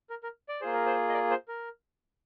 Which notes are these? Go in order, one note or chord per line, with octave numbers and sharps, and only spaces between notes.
A#4
A#4
D5
A#3 F4 G#4 C5
A#4
C5
D#5
A#4 D5
C5
A#4